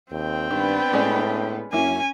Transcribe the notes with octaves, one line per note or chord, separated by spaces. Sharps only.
D#2 C4 G5
G2 D#3 B3 D4 B4
A2 G#3 C#4 D5
F#2 A#3 C#4 E4 G#5